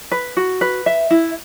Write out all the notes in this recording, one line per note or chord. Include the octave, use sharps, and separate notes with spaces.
B4
F#4
B4
E5
E4